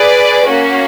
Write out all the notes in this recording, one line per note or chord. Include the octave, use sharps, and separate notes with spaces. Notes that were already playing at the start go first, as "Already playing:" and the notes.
Already playing: G#4 B4 D5
A#3 C#4 F#4